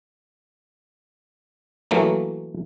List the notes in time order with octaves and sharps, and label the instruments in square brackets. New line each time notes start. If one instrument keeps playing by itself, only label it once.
[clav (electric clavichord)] E3 F#3 A3 A#3